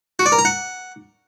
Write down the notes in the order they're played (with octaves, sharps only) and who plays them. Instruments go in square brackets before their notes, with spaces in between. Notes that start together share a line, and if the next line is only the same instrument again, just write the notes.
[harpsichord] F#4
D5
A#4
A#5
F#5